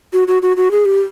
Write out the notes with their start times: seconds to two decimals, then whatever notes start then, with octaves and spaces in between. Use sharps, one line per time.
0.13 F#4
0.28 F#4
0.42 F#4
0.57 F#4
0.71 G#4
0.85 G4